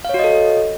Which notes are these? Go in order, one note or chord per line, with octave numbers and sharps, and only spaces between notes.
F#4 A4 C#5 D#5 F5